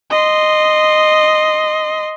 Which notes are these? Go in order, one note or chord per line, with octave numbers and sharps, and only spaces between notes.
D#5 C6